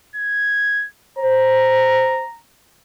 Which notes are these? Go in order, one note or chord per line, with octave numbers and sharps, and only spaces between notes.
G#6
C5 A#5